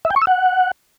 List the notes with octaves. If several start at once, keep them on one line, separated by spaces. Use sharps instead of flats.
E5
G5
C#6
E6
F#5